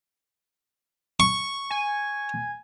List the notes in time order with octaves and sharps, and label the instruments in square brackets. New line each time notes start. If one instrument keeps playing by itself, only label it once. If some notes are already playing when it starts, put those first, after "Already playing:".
[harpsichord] C#6
[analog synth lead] G#5